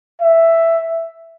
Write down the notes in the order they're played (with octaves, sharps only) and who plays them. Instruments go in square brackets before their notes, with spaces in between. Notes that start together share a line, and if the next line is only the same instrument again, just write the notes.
[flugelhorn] E5